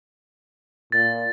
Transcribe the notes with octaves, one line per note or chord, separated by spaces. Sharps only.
A#2 A6